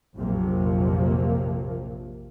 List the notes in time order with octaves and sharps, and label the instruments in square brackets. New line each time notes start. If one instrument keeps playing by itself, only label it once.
[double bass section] A#1 F2 C3 F3 F#3 A#3